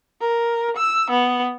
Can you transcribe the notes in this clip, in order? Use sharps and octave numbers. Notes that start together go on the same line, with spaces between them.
A#4
E6
B3